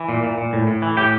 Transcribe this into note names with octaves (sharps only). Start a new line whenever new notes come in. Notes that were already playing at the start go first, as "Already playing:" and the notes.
Already playing: E3
A#2
A#2
A#2
A2
A2
E3
A2 G4